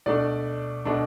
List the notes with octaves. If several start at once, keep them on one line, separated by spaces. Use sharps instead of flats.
B2 A3 D4 D5
B2 A3 D4